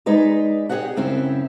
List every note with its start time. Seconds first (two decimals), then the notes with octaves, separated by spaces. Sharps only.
0.06 G#3 D#4 G#4 B4 D5
0.69 G4 G#4 C#5 D#5 F#5
0.96 F#2 C#3 C4 C#4 E4